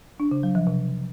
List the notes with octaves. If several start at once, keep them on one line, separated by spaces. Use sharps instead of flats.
D4
C#3
F#3
F3
C3